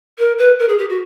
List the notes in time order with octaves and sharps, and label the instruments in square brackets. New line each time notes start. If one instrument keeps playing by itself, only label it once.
[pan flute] A#4
B4
A#4
G#4
G4
F#4